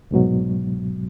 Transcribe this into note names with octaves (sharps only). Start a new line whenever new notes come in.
C2 G#2 B2 F#3